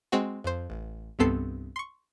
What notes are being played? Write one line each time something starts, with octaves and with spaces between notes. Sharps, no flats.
G#3 C4 F#4
F2 C5
A1
C2 G2 B3 C4 A4 C7
C6 C#6